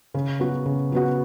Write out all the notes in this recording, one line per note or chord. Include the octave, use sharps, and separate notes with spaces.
C#3
F#3 B3 F#4
C#3
F#3 B3 F#4